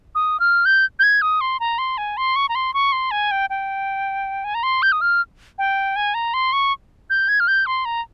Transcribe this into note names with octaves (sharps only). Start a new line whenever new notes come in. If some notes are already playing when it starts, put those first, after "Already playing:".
D#6
F6
G6
G6
G#6
D#6
C6
A#5
C6
G#5
C6
C#6
A#5
C6
C#6
C6
G#5
G5
G5
G#5
A#5
C6
G6
D#6
F6
G5
G#5
A#5
C6
C#6
G6
G#6
F6
G6
C6
A#5